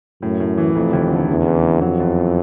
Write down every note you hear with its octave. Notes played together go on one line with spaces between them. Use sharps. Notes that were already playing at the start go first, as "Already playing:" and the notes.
F#2 A2
A2
E3
F1 F2
D#2
D3
E2 C#3
E3
E3
F2 F#3
E2